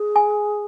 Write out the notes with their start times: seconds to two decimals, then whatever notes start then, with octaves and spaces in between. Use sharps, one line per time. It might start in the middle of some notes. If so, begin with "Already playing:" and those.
Already playing: G#4
0.16 G#5